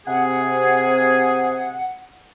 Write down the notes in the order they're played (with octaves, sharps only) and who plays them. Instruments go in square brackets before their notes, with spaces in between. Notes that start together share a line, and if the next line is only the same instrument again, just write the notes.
[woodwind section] C3 G#4 [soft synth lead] F#5